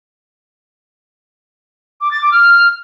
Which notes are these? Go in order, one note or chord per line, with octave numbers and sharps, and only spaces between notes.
D6
A6
D6
F6